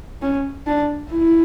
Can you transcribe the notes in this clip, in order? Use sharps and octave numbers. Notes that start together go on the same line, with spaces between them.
C#4
D4
E4